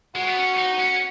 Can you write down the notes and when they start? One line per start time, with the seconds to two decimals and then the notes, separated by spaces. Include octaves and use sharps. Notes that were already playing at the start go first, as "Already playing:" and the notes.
0.15 G#3 F#4
0.27 B3
0.37 C#4
0.58 D#4
0.80 C#4